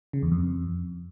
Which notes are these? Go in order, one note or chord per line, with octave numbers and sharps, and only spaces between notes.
C#3
E2
F2